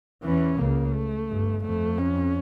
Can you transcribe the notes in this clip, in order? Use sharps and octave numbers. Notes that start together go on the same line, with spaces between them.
E2 E3 C#4
C#2 C#3 A#3
A3
G1 G2
F2 A3
C#4